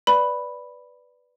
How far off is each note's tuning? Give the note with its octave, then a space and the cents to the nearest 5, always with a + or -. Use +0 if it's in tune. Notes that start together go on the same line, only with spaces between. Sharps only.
B4 +0 D5 +0 B5 +0